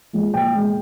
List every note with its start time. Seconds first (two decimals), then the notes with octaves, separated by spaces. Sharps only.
0.13 F3 G#3
0.34 A#2 G5
0.55 G#3